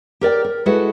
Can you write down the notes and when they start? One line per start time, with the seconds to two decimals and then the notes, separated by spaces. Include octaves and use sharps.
0.21 G4 A#4 D5 G5
0.44 A#4
0.66 G#3 E4 F#4 A4 B4